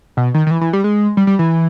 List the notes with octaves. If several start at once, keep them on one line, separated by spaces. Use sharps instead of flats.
B2
D#3
D#3
E3
E3
G3
G#3
G3
G3
E3